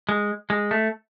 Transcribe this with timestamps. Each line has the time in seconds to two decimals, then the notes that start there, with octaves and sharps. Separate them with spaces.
0.09 G#3
0.50 G#3
0.71 A3